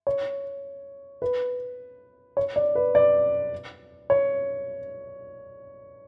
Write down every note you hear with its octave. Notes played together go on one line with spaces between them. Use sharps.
C#5
B4
C#5
D5
B4
D5
C#5